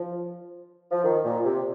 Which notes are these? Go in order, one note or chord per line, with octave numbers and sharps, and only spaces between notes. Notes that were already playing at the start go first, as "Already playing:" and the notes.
Already playing: F3
F3
D#3
A#2
C3